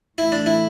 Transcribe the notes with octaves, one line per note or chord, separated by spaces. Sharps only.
A2 E3 A3 E4
D4
E4